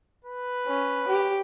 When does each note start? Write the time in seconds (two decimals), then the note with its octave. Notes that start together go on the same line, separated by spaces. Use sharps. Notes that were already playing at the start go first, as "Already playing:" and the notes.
0.25 B4
0.67 C#4
1.08 G4